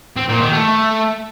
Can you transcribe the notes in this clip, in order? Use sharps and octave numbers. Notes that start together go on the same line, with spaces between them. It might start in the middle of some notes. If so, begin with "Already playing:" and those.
C4
A#2
D#3
A3